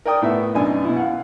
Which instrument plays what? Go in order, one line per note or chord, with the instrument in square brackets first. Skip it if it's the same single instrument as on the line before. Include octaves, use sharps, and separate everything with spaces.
[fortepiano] A#4 D5 G5 D#6
A2 B3 E5
F#2 B2 D4 D#4 G#5
B2 E4
F5 F#5